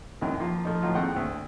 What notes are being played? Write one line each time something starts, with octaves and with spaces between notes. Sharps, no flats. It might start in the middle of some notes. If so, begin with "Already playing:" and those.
C2 F#2 D#3 F#3
F3 A#3 F4
F3 A3 D#4
A2 F3 F#3 D#4 F4
D#2 A2 G#3 C4 F#5 G5
D2